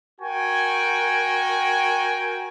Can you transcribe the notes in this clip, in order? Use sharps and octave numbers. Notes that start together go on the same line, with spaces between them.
F#4 A#4 G5 G#5